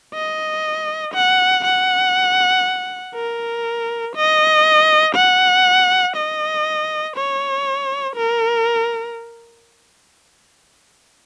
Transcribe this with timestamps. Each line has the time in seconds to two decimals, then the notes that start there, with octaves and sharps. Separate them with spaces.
0.14 D#5
1.14 F#5
1.65 F#5
3.15 A#4
4.16 D#5
5.15 F#5
6.17 D#5
7.17 C#5
8.16 A#4